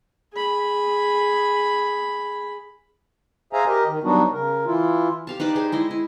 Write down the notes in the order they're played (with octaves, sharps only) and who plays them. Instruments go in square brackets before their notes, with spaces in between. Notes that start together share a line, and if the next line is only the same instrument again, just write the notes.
[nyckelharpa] G#4 B5
[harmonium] G#4 C5 E5 F5 G#5 A#5
G4 A#4 D#5
D#3
F#3 G3 B3 D4 D#4 F#4
C#3 A#4
E3 E4 F4
[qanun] G4 F5 A5
D#4 B4 C5 D5
G4 G#4 C5
G#3 E4 D#5
E4